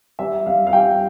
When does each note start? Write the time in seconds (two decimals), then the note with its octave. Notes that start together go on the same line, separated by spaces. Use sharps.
0.19 G3 E5
0.46 G3 F5
0.67 F5
0.73 G3 G5